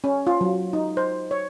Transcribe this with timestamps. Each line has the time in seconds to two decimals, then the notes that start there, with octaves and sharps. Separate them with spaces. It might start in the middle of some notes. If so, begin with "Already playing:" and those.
0.04 C#4
0.27 F4
0.41 F#3
0.73 D#4
0.97 C5
1.31 C#5